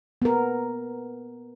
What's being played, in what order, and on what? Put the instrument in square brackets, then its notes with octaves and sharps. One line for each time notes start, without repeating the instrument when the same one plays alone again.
[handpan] B3 A#4